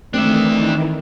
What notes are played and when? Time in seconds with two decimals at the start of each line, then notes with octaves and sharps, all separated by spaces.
0.14 D#3 E3 A3 C4 D4 E5